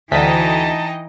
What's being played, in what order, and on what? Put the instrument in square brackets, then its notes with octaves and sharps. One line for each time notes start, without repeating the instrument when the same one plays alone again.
[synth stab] D2 B6 [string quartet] E3 [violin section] D#4 D#5 G5 [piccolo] A5